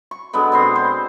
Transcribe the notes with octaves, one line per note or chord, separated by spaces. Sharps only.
C#6
D3 F#3 G#3 B3
B2 C4 C6
C5